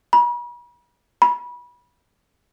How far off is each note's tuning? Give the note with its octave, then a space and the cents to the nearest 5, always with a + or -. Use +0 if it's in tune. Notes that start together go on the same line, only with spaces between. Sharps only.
B5 -40
B5 -25